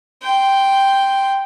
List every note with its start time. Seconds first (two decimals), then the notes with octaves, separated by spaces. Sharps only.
0.23 G5 C6